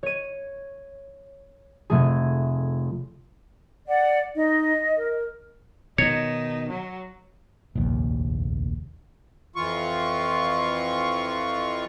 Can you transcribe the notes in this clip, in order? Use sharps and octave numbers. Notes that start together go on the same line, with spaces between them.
C#5 D#7
F1 A3 G#4
D5 F#5
D#4 D#5
A#4
B2 D#3 D#4 C#5
F#3
F1 A#1 D#2
F2 E3 F4 C#6